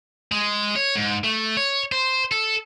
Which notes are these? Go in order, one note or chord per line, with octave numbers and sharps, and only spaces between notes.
G#3
C#5
G#2
A3
C#5
C5
A4